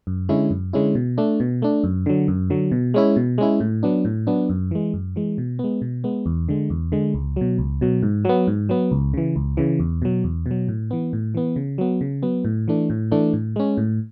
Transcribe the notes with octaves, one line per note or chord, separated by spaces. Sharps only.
F#2
D3 G#3 C#4 E4
F#2
D3 G#3 C#4 E4
B2
A3 D4
B2
A3 D4
F#2
D3 F#3
F#2
D3 F#3
B2
G#3 C#4 E4
B2
G#3 C#4 E4
A2
F#3 B3 D4
A2
F#3 B3 D4
F#2
E3 G#3
F#2
E3 G#3
B2
G#3 B3
B2
G#3 B3
E2
D3 G#3
E2
D3 G#3
C#2
B2 F#3
C#2
B2 F#3
G#2
F#3 B3
G#2
F#3 B3
C#2
C#3 E3
C#2
C#3 E3
E2
B2 F#3
E2
B2
F#3
A2
E3 B3
A2
E3 B3
C#3
F#3 B3
C#3
F#3 B3
A2
E3 A3 D4
A2
E3 A3 D4
A2
G#3 C#4
A2